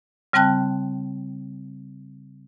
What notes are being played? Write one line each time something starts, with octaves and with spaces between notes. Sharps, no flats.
C#3 G3 C4 G5 A5 F#6